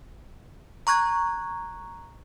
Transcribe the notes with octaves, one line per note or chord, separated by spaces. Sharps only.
A#5 C#6 F#6 G#6